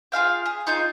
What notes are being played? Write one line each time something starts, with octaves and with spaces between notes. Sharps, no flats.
F4 G#4 F5 G5
G#4
D#4 F4 G#4 G6